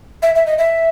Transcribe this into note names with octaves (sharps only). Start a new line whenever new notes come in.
E5
E5
D#5
E5